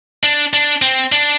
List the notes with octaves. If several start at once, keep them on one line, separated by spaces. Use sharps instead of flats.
D4
D4
C4
D4